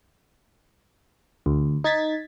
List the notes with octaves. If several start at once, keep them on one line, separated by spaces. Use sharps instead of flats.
D2
D#4 G#6 A6 B6